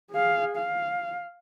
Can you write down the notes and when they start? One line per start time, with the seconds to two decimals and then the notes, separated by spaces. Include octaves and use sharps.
0.11 G#4 F5
0.57 F5